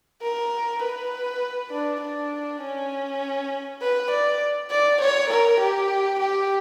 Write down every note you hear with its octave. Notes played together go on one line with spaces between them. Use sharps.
A#4
B4
D4
D4
C#4
B4
D5
D5
C#5
A#4
G4
G4